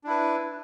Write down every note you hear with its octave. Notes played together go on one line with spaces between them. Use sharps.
D4 E4 B4